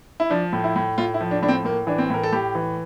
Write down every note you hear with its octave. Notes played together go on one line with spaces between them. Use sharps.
E4
F3 D4
A2
E4
A2
A2 F4
E4
F3
D4
A2 D4
C4
A2 A#3
E3 D4
C4
A2 A#4
A4
A2 G4
E3